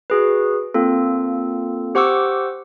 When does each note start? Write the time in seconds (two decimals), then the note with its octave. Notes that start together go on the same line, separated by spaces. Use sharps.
0.10 F#4 G#4 B4
0.74 A#3 C4 F4 A4
1.95 G4 C5 F#5 C#6 D6 E6